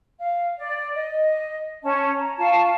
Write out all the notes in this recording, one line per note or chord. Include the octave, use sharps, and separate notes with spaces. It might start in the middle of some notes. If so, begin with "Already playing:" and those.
F5
D5
D#5
C#4 A5
A#5
F4 F5 A5 C#6